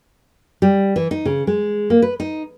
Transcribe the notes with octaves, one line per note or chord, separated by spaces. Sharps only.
G3
E3
D#4
C#3
G#3
A#3
B4
D#4